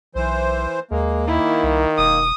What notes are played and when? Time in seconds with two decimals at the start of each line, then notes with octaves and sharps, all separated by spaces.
0.15 B1 E3 C5
0.91 D#2 G#3 A#3
1.28 D#3 E4
1.63 C2
1.98 E1 D#6